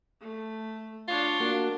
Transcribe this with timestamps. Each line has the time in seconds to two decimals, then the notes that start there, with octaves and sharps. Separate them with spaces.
0.21 A3
1.08 D4 F4 C#5
1.40 A#3 D4 F#4